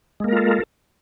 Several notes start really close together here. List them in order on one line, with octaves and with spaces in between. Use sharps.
G#3 A#3 A#4 F4 A4